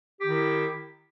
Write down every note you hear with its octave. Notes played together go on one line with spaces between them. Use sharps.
D#3 E4 G4